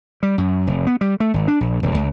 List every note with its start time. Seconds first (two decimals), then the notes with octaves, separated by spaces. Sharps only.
0.23 G3
0.38 F#2
0.67 F1
0.87 B3
1.01 G3
1.20 A3
1.34 G#1
1.48 D4
1.61 A#1
1.83 D#1
1.95 C#2